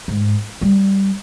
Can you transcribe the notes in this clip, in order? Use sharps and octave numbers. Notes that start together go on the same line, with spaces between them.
G#2
G3